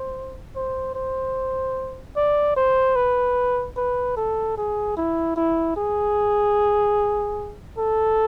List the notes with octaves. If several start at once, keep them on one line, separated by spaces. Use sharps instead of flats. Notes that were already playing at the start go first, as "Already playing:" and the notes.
Already playing: C5
C5
C5
D5
C5
B4
B4
A4
G#4
E4
E4
G#4
A4